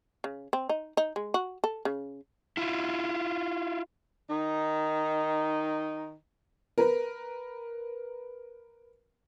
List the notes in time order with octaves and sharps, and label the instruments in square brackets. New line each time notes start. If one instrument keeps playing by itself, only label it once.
[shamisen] C#3
C4
D#4
D#4
G#3
F#4
A4
C#3
[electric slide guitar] E4 F4
[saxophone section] D#3 D#4
[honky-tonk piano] A#4 B4